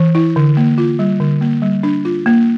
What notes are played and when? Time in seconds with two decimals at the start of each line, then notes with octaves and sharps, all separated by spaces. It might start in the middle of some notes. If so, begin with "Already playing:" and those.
Already playing: E3
0.15 E4
0.36 D3
0.57 A#3
0.78 F4
0.99 G3
1.20 D3
1.41 A#3
1.62 G3
1.83 D4
2.05 F4
2.26 A#3